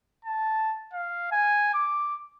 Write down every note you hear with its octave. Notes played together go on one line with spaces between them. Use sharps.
A5
F5
G#5
D6